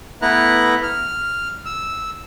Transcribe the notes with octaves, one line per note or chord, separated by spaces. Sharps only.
A3 B3 E4 B4 A#5 F#6
F6
E6